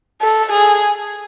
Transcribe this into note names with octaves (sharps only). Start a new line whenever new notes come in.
A4
G#4